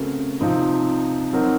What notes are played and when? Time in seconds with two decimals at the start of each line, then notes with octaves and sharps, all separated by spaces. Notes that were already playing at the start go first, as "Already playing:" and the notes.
Already playing: C#3 A3 C4 F#4 A#4
0.41 C3 F3 C4 D#4
1.33 F#3 C4 D#4 A#4